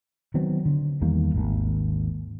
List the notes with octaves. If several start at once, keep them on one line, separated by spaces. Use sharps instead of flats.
D#3 F#3 B3 C4
D3
E2 D#3 G3 A#3
G#1 D#2